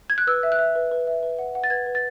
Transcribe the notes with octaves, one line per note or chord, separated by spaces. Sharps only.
G#6
F#6
B4 E6
E5
F#6
E5
B4
B4
E5
B4
F#5
F#5
A6
B4 G#6
B4
A6